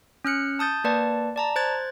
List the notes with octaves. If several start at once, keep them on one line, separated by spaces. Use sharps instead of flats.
C#4 F6 F#6 C#7
A5 D#6 G6 A6
A#3 B4 D5 A5
D5 A5 A#5
C5 F#6 G#6 A6